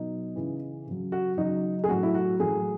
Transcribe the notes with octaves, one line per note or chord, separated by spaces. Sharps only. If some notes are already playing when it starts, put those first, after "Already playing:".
Already playing: B2 F#3 D#4
C#3 E3
C#3 F#3
F#4
C#3 F#3 D#4
G#4
A2 F#3 F#4
E4
F#4
A2 F#3 G#4